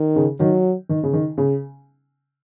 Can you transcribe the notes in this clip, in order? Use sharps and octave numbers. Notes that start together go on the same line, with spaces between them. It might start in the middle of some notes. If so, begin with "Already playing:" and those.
Already playing: D#3
C#3
D#3 F#3
D#3
C#3
D#3
C#3